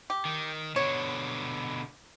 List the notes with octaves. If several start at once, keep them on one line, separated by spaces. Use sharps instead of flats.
G4
D#3
B2 D3 C#5